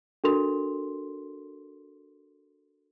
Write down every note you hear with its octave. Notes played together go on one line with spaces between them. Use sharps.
D4 F#4 A4 A#4 C6 F7